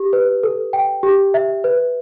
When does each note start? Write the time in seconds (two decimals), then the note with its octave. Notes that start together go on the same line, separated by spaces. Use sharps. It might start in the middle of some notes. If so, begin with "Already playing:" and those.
Already playing: G4
0.13 B4
0.43 A4
0.73 G5
1.03 G4
1.34 E5
1.64 B4